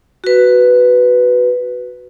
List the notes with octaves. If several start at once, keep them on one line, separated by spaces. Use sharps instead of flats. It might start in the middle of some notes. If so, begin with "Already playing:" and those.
F#4 B4